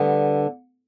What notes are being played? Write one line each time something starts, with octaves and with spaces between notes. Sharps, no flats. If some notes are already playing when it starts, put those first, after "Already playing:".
Already playing: D3 G3 B3